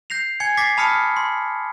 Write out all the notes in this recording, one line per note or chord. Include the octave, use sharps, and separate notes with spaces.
G6 A#6 C7 F7
G#5 G#6 C#7
D6 A6 B6 C7
A5 B5 D#6 F6 B6 C#7
C6